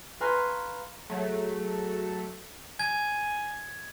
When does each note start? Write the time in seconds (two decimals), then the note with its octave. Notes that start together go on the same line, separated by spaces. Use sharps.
0.21 B4 F5 G#5 A#5 C6 C#6
1.10 F#3 A3 G#4
2.80 G#5 G#6